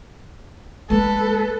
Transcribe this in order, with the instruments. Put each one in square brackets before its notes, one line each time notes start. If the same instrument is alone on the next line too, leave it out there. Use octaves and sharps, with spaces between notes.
[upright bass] G#3 A#3 [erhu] A4 [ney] B4